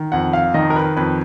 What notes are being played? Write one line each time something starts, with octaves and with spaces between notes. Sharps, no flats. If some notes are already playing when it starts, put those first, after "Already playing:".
Already playing: D#3
F2 F#5
F5
D#3 D#5
A#4
B4
F2 B4